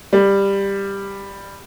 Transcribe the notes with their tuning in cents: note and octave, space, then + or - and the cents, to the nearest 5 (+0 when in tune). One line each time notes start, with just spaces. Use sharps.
G3 +10